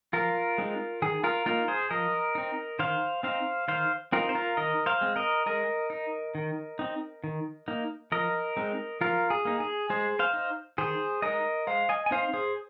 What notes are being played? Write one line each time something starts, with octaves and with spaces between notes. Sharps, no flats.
F3 F4 A#4
G#3 C4 D#4
D#3 G#4
F4 A#4
A#3 D#4 F4 A#4
G#4 C5
F3 A#4 D#5
C4 D#4
D#3 C5 F5
C4 D#4 C5 F5
D#3 C5 F5
C4 D#4 F4 A#4
C5
F4 A#4
D#3 A#4 D#5
C5 F5
G#3 C4
A#4 D#5
G#3 A#4 D#5
D#4
D#3
C4 D#4
D#3
A#3 D#4
F3 A#4 D#5
G#3 C4 D#4
F3 F4 A#4
G#4
A#3 D#4
G#4
G#3 G#4 C5
C5 F5
D#4
D#3 G#4 C5
G#3 D#4 A#4 D#5
G#3 C5 F5
D#5 G#5
G#5
C4 D#4 C5 F5
G#4 C5